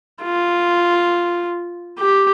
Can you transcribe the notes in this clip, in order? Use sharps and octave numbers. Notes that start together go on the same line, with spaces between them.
F4
G4